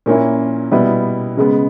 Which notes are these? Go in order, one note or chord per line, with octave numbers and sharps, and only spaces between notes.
A#2 A#3 C#4 E4
B2 G3 B3 E4
C#3 G#3 B3